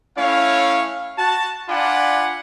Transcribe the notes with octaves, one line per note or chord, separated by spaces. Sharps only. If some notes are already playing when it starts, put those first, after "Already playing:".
A3 C#4 E4 C#5 F5
F#4 A5
D4 F4 D5 F#5 G#5 B5